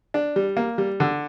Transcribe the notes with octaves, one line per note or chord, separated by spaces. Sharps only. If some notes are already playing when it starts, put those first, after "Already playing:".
D4
G3
A#3
G3
D3